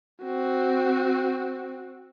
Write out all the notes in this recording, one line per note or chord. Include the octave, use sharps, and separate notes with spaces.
C4 F#4